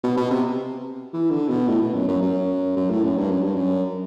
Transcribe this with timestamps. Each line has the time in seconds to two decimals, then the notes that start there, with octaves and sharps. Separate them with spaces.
0.04 B2
0.17 B2
0.31 C3
1.13 E3
1.31 D3
1.49 B2
1.68 A2
1.81 B2
1.94 F#2
2.08 F#2
2.23 F#2
2.77 F#2
2.91 A2
3.04 F#2
3.18 G2
3.31 F#2
3.43 G2
3.56 F#2